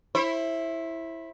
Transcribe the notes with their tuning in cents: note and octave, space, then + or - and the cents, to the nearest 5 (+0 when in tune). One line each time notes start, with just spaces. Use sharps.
E4 +0 C5 +40